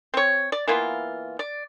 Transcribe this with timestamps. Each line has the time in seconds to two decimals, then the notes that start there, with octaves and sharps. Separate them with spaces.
0.14 C4 C#5
0.52 D5
0.67 E3 A#3 B3 F4
1.39 D5